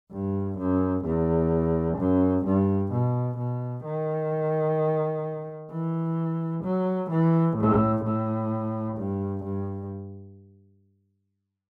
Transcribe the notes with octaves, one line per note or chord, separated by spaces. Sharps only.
G2
F#2
E2
F#2
G2
B2
B2
D#3
E3
F#3
E3
A2
A2
G2
G2